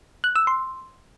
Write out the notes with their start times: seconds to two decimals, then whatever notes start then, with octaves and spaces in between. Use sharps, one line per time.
0.24 F#6
0.36 E6
0.47 C6